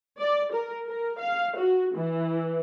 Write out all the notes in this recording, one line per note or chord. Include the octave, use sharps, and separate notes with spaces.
D5
A#4
A#4
F5
F#4
E3